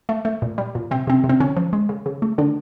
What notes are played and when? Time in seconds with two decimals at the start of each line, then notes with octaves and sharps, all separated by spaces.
0.09 A3
0.25 A3
0.42 A#2
0.58 G3
0.75 A#2
0.91 C3 C4
1.07 C3 C4
1.24 C3
1.29 C4
1.40 D3 C#4
1.57 F3
1.73 G#3
1.89 C#3
2.06 C#3
2.22 A3
2.38 D3 D4